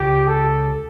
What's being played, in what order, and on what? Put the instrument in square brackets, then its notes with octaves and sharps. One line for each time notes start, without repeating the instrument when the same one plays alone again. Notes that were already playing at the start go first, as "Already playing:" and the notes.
Already playing: [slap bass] C#2 C#3 [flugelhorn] G4
[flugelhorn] A4